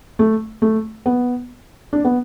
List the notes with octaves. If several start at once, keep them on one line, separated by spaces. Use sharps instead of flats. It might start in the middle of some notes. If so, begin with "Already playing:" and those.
A3
A3
B3
D4
B3